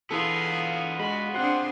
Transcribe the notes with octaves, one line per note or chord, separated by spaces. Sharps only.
E3 B3 F4 G#4 A4
G#3 F#4 B5
C4 D4 G#4 F#5 C6